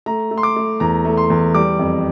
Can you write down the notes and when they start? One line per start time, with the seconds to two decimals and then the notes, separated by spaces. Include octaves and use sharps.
0.06 A3 A#5
0.31 A3
0.38 C6
0.43 D6
0.56 A3
0.80 E2 A#5
1.05 A3
1.17 C6
1.30 E2
1.55 G3 D6
1.79 F2